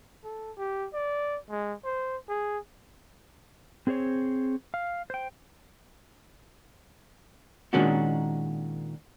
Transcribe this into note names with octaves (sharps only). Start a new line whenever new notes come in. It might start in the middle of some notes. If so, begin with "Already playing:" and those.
A4
G4
D5
G#3
C5
G#4
C4 G#4 C5 C#5
F5
C5 G5
A#2 D#3 G#3 C#4 D4 F#4